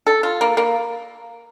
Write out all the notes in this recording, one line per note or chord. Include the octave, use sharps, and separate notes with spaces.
A4
F4
A#3
A#3